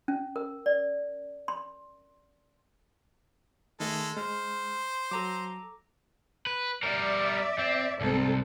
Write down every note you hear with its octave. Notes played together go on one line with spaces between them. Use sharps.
C#4
A#4
D5
C6
D#3 G#3 A3 A4
G#3 C5 F6
F#3 A4 A#5 D6
B4
G3 A#4 D5 E5
C4
C2 G#2 C4 A4